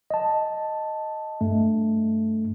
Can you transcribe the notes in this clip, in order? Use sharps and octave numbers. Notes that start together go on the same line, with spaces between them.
D#5 A5
G2 A3